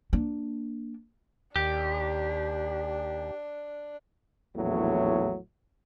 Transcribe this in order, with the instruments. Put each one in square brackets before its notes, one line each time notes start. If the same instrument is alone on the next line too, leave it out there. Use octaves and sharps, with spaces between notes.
[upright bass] A#3 D4
[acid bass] D#2 [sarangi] D4 [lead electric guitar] G4
[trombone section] A#1 E2 A2 F#3